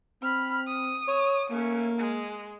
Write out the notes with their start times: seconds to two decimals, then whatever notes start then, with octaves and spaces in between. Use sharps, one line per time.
0.22 C4 B5 F6
0.67 D#6
1.08 C#5
1.51 A3 A#3 C#4
1.98 G#3